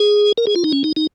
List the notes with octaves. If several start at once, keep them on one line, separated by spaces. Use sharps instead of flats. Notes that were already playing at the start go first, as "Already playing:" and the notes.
Already playing: G#4
A#4
G#4
F4
D#4
C#4
D#4
D#4